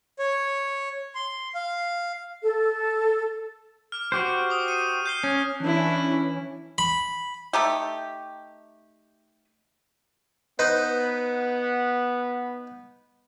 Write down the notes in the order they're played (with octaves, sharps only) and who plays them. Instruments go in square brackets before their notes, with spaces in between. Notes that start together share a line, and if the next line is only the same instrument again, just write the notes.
[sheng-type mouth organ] C#5
C6
F5
[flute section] A4
[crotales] D6 F6
[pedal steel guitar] F#4 G4 C5
[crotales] D6 D#6
C#7 D#7
G6 C7 G7
[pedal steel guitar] C#4 [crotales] F6 C7
[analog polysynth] E3 C#4 [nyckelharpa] D4 E4
[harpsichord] B5
[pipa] A3 D#4 G4
[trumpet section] B3 [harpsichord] D#4 B4 C5